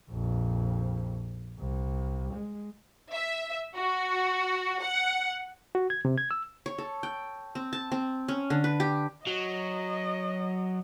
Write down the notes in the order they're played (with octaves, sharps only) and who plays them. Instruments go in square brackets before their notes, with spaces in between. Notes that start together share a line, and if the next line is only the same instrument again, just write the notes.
[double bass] A#1 F2
C2
G#3
[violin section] E5
F#4
F#5
[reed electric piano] F#4
G#6
C3
G#6
E6
[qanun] C#5
A4
G5
C4
A5
C4
C#4
D3
B4
G4
[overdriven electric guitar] F#3 [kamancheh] D#5